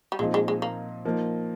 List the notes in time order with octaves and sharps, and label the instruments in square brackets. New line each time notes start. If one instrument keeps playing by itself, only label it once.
[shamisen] G3
[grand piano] A#2 F3 C4 D#4 [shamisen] G#3
[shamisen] G#3
G#3
A#3
[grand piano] F3 A#3 D#4 A#4